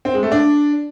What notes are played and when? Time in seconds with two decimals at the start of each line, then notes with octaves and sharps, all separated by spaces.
0.05 C4
0.14 G#3
0.23 A3
0.32 D4